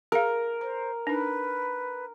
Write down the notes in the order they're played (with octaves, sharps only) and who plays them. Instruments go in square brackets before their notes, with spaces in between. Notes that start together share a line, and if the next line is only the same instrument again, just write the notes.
[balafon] G#4 F5 [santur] A#4
[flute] C5 [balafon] A#5
[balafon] D4 D#4 [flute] B4